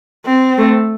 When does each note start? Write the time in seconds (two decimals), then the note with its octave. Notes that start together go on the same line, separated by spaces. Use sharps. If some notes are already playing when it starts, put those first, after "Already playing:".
0.26 C4
0.58 A3